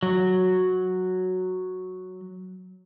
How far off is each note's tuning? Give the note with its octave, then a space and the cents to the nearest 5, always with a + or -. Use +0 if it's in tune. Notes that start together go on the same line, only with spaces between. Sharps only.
F#3 -5